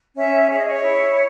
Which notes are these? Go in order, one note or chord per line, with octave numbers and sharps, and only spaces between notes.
C#4 E5
G#4 C#5
D#5
C#5
E4